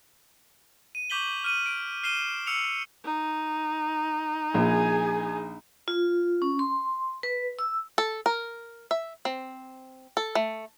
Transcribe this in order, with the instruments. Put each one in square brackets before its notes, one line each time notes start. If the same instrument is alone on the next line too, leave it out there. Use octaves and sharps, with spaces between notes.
[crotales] D#7
C#6 D6 G6 B6 F#7 G7
F6 D#7 F#7
D7
F6 C7 D#7 E7 G7
E6 C#7 F7
[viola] D#4
[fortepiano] A#1 [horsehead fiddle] G#4 G#5
[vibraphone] F4
C#4
C6
B4
E6
[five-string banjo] A4
A#4
E5
C4
A4
A3